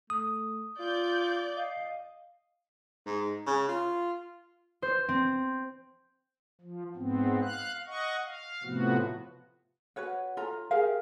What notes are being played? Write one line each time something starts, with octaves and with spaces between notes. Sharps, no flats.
A3 D#6
F4 D5 G6
D#5 F5
G#2
C#3
F4
C5
C4
F3
G#2 B3 C4
F5 F#6
D#5 F#5 C#6
F5
A2 C3 F3 B3 F#4
F#4 B4 C#5 F#5
F4 A4 A#5
G4 G#4 A#4 F5